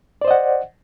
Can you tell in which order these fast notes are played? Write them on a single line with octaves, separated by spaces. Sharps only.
D5 C5 D#5 F#5